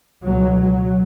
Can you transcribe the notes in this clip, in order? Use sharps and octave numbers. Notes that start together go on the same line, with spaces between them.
C#2 B2 F#3
F#3